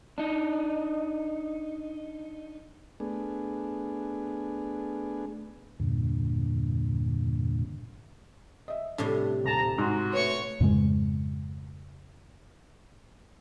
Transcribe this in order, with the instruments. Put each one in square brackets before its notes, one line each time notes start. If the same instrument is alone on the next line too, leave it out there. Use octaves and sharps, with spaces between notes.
[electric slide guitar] D4 D#4
[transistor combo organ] A3 B3 D4 G#4
[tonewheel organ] E2 G2 A#2 D3
[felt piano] D#5 E5
[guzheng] A2 C3 G3 [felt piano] D4
[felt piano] D#1 [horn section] A5 A#5
[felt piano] G#2 [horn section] F#4 C6
[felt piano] A3 B4 [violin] C#5 C#6
[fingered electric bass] F2 G#2 C#3 G#3